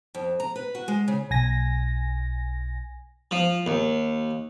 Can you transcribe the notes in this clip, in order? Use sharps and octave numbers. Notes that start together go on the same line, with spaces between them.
F2
A#5
B4
F#4
G#3
C#3
B1 G#5 A#6
F3
D#2